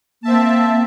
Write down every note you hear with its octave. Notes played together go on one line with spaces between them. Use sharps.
A#3 C4 E5 A5